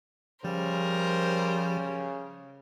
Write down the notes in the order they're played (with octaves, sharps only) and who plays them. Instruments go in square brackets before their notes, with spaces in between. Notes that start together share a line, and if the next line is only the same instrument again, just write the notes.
[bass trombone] C#3 [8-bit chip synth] F3 [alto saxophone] G3 [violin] A#4 C5